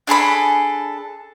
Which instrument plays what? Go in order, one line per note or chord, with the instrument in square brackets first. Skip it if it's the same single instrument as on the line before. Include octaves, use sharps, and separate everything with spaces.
[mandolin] D4 G#4 A4 B5